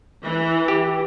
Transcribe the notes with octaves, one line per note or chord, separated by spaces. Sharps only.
E3
G4